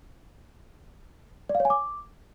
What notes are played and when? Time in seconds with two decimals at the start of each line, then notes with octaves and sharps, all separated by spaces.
1.49 D5
1.55 F5
1.60 C#5
1.65 G#5
1.70 D6